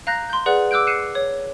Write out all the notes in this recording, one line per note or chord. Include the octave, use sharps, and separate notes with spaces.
F5 A#5 F#6 G6 A#6
C6 G6
G#4 B4 D5 F#5 F#6
D6 E6 F#6 G6 D7
F#6 C7 C#7 D#7 E7
C#5